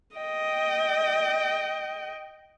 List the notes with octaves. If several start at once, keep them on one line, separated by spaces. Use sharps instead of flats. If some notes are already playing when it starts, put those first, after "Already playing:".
D#5 G5